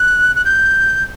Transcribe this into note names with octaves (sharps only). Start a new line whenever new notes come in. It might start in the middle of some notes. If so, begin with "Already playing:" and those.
Already playing: F#6
F#6
G6